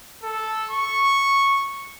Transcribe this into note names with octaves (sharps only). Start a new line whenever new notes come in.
A4
C#6